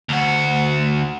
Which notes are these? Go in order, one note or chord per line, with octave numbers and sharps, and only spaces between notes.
D2 F#4